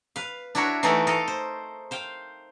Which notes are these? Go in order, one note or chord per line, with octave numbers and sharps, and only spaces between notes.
B4 F5
D4 E4 F#4 A#4 C#5 F#5
E3 A3 D#4 F#4 A4 A#4
A4 A#4 D#5 F5
C5
C5 F5 G5